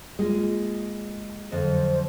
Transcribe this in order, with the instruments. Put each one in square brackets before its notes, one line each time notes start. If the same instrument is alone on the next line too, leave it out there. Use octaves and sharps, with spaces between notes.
[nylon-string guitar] G#3 [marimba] A#3 F4
[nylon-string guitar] F2 [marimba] D3 F#3 [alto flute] C5